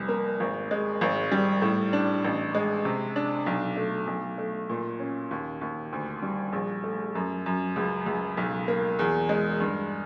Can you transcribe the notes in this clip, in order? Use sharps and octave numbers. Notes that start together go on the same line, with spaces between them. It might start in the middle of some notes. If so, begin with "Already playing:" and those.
Already playing: F1 C2
A#3
G#1
G#3
G#1
G3
A2
D4
A1
G#3
C3
D4
B1
A3
B1
A3
A#2
C#4
D#2
D#2
D2
G3
A#1
A3
F#2
F#2
C#2
C#2
B1
A#3
E2
G#3
G2